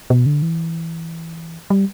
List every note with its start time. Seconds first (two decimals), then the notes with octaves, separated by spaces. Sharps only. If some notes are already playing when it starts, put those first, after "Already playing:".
0.10 B2
0.26 D3
0.42 E3
1.70 G3